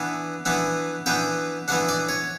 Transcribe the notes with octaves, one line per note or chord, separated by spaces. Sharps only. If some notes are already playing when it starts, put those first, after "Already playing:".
Already playing: E3 B3 D4
E3 B3 D4
E3 B3 D4 G5
E3 B3 D4 F#5
D5
C#5